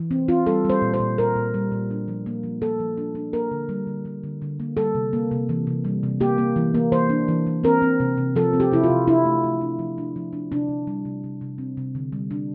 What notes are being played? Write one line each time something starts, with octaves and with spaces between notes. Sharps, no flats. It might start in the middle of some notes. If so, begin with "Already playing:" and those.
Already playing: E3
C4
C4 F4
G3 A4
G3 C5
A#2
C5
A#2
A#2 A#4
A#2
G3
A#2
D4
F3
A#3
F3
A#3 A4
F3
D4
D4
A#3 A#4
D3
G3
D3
G3
D3
D3
A#3
G3 A4
C3
A#3
C3
E3
C3
G3
C3
A#3 G4
A#3
E3
A#3
E3 C5
D4
E3
E3
C4 A#4
C4
C3
C3
F3 A4
C4
G4
C3 E4
F4
C3
D4 E4
A3
A3
D4
F3
D4
F3
D4
C3 D4
C3
G3
C3
C3
C3
C4
C3
D3
G3
D4